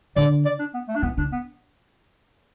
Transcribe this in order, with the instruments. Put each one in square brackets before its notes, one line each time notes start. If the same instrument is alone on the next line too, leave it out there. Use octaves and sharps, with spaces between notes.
[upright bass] D3 [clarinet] D5
[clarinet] D5
D4
B3
A3
D4
[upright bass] E3 [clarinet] B3
[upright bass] D3 [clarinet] D4
[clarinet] B3